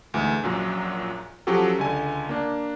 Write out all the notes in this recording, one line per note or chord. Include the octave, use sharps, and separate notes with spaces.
D2 G#2 E3 G#3
A#1 F#2 A#2 F#3
F3 F#3 C#4 F#4 G4 A4
C#2 D3 G#5
A#3 D4